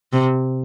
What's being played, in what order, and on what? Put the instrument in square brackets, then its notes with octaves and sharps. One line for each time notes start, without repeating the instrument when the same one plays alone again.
[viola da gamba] C3